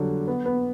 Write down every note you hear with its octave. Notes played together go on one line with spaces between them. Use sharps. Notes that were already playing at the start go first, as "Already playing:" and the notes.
Already playing: D3 F#3 G3
B3
B3